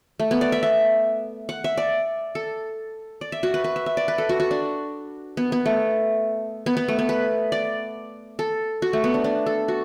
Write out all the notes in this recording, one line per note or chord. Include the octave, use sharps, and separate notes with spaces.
A3
B3
D5
E5
E5
F#5
E5
D5
A4
D5
E5
F#4
B4
B4
E5
E5
D5
B4
A4
F#4
F#4
D4
B3
B3
A3
B3
B3
A3
B3
B4
D5
A4
F#4
A3
B3
D4
D4
A4
F#4